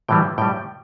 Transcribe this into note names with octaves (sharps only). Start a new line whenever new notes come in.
A2 E3 G3 G5
A2 G3 G5